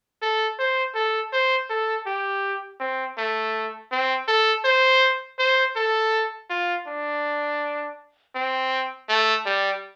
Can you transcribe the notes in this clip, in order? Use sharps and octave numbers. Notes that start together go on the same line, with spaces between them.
A4
C5
A4
C5
A4
G4
C4
A3
C4
A4
C5
C5
A4
F4
D4
C4
A3
G3